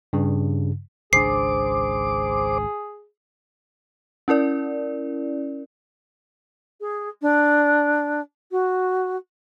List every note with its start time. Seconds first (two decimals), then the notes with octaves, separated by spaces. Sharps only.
0.13 G2 C#3
1.13 G#1 C#2 D4 G#4 C5 D6 C7
4.28 C#4 E4 A#4 D5
6.81 G#4
7.22 D4
8.51 F#4